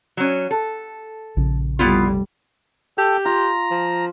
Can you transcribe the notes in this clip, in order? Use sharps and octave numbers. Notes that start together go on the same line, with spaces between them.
F#3 C#4
A4
A#1 C#3
F1 G3 B3 E4 F4
G4 A4 G5
F4 A#5
F3